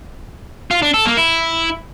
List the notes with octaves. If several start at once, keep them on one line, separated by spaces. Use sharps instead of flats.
F4
D4
A4
A#3
E4